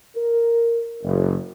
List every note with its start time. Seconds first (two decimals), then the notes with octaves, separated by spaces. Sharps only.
0.16 A#4
1.03 F#1